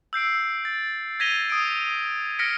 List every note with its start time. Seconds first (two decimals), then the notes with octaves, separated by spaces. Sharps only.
0.13 E6 G6 C7 D7
0.65 A6
1.20 G#6 A#6 B6 D#7 F7 G7
1.50 D#6 D7
2.39 F6 A#6 B6 C#7 D7